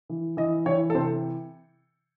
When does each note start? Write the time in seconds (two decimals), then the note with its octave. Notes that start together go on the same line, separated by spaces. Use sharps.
0.09 E3
0.37 E3 D#5
0.66 E3 C#5
0.90 A4
0.95 C3 C5